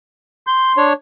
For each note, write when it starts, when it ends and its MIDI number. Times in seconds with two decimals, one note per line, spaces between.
0.47 0.85 84
0.47 0.72 91
0.77 0.93 62
0.77 0.93 73